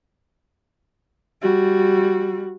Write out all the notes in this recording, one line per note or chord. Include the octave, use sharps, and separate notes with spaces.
G3 F#4